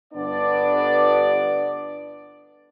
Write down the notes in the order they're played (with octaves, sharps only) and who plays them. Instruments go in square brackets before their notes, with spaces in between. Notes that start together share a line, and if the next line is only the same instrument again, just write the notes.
[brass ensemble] G1 B3 D4 D5